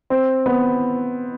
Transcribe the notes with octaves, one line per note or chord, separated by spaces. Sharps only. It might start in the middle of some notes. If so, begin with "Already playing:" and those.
C4
B3